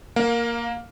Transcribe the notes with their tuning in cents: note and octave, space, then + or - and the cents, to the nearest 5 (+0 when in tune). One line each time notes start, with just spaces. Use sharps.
A#3 +0 F5 +25